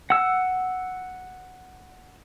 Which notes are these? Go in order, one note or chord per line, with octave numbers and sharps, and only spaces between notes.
F#5 E6